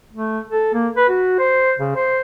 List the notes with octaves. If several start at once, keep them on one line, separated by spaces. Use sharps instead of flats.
A3
A4
A#3
B4
F#4
C5
C#3
C5